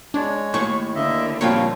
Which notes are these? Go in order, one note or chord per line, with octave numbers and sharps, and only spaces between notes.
G#3 D4 C#5
D#2 A2 C#6
D3 A#3 D#5 E5
A#2 F3 G3 C4 F4 C#5